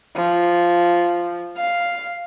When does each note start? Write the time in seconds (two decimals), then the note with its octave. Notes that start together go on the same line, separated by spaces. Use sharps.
0.16 F3
1.57 F5